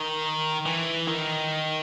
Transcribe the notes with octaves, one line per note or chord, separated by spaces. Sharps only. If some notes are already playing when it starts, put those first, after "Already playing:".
Already playing: D#3
E3
D#3